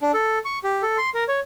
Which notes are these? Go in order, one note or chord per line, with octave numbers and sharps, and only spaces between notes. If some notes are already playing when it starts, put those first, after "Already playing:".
D4
A4
C#6
G4
A4
C6
A#4
C#5